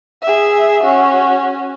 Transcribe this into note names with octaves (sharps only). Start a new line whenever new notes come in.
G#4 E5
C#4 F#4